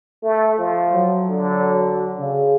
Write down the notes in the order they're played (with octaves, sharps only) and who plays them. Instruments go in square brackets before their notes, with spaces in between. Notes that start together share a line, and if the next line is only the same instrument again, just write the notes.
[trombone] A3
F3
[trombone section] F#3
[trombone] D3
[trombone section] C#3